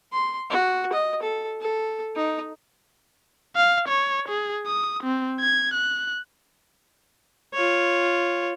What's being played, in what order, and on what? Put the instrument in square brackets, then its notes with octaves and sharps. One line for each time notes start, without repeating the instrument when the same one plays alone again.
[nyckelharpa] C6
F#4
D#5
A4
A4
D#4
[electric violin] F5
C#5
G#4
D#6
C4
G#6
F#6
[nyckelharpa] F4 C#5